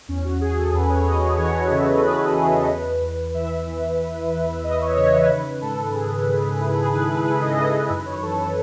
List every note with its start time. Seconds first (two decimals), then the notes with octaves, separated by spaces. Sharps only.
0.08 E2 C#4
0.25 F#4
0.41 E2 G#4
0.57 A4
0.73 E2 B4
0.90 C#5
1.06 E2 D#5
1.22 G#4
1.38 E3 C#5
1.55 C#5
1.71 C#3 E5
1.87 D#5
2.03 E3 B4
2.20 A4
2.36 E2 G#4
2.53 A4
2.68 E2 B4
3.02 E2
3.34 E3 E5
3.67 E3
3.99 E2
4.31 E2
4.64 E2 D#5
4.81 C#5
4.96 C#3 C#5
5.14 B4
5.29 D#3 B4
5.62 G#2 A4
5.94 G#2 G#4
6.28 D#3
6.60 D#3 E4
6.76 G#4
6.92 D#3 B4
7.09 B4
7.25 D#3 B4
7.41 D#5
7.57 D#3 D#5
7.73 B4
7.90 F#2 B4
8.06 C#5
8.22 E3 A4
8.39 A4